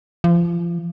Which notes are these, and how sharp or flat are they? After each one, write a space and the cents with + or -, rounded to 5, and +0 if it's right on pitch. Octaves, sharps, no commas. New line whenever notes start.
F3 -30